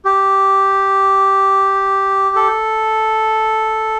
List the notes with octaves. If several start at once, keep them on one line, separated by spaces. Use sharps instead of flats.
G4
A4